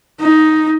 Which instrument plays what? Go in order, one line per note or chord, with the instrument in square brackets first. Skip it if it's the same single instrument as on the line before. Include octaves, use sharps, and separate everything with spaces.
[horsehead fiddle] D#4